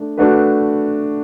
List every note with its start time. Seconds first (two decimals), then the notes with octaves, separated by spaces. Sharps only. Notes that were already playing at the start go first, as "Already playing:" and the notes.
Already playing: A3 D4
0.17 A3 D4 F#4 B4